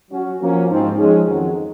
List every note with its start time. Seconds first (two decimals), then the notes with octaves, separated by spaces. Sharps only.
0.10 F#3 C#4 F#4
0.39 F3 A#3 C#4 F#4
0.68 G#2 F3 C4 D#4
0.97 F3 G#3 C#4 G#4
1.26 F2 D#3 F#3